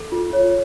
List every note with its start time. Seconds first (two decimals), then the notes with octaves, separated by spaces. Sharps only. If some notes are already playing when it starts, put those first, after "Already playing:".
Already playing: A4
0.12 F4
0.33 C#5